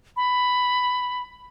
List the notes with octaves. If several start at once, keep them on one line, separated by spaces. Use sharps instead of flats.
B5